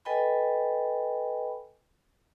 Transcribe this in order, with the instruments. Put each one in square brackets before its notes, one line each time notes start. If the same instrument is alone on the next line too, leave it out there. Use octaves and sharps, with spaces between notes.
[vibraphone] A4 B4 D#5 G5 G#5 B5